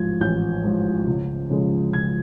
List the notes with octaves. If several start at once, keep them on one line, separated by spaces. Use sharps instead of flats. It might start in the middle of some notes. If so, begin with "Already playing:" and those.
Already playing: A1 G#2 F3 G#6
A1 G6
G#2 F3
C#2
C#3 F3 G#3
C#2 G#6